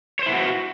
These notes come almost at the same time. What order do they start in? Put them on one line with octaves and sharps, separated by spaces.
C#5 C5 E4 B3 F#4